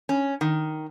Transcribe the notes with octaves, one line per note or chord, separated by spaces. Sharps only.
C#4
D#3